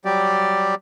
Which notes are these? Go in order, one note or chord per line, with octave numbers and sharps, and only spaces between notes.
F#3 G3 G4 D5